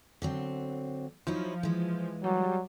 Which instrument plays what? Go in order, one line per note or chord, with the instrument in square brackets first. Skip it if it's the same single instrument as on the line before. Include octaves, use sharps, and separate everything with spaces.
[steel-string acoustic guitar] D3 F#3 C4
[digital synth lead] F3 [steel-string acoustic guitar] F#3 D#4 E4
[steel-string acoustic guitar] E3 G#3
[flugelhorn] F#3 [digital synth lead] G3